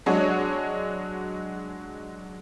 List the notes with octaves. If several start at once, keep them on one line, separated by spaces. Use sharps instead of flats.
F#3 G#3 D4 F#4 G#4 C#5